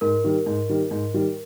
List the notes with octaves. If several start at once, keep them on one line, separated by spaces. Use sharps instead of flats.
G#2 A#4
D#3 G3
G#2
D#3 G3
G#2
D#3 G3